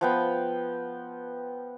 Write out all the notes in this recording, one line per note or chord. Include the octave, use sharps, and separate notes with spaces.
F3 B3 G5